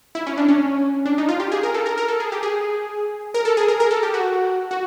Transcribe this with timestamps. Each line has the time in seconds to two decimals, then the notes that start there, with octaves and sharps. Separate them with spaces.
0.15 E4
0.27 C#4
0.37 D4
0.48 C#4
1.05 D4
1.18 D#4
1.29 F4
1.40 G4
1.52 G#4
1.63 A#4
1.74 A4
1.86 A#4
1.98 A#4
2.08 A4
2.20 G#4
2.32 G4
2.43 G#4
3.34 A#4
3.45 A4
3.57 G#4
3.68 A#4
3.80 A#4
3.91 A4
4.03 G4
4.14 F#4
4.71 F#4